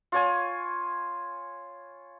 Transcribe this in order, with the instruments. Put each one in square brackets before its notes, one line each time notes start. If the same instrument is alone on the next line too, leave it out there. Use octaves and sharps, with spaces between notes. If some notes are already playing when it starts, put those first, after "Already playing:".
[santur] F4 C#5 G#5